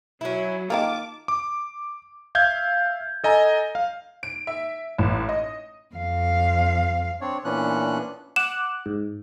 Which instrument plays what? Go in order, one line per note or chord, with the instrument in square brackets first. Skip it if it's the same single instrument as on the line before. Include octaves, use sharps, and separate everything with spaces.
[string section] F#3 [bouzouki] C#4 E4
[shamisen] D#3 G#3 A#3 [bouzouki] F4 A5 [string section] D6
[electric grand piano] D6
E5 F5 G6 G#6
A4 D#5 G#5 A#5
F5
[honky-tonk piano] D7
E5
A1
D#5
[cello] F2 F5
[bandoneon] C4 D4 C#5 D5
A#2 E3 B3 C#4 D4 F#6
[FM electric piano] F#5 D6 F#6 [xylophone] E7
[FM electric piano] G#2